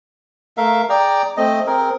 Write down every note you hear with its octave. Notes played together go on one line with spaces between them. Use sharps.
A3 A#4 E5 F5
G#4 D5 G5 A#5
A3 C4 D#5
C4 G#4 A#4